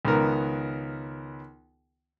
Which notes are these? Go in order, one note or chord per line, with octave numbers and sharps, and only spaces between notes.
C#2 D#3 B3 A#4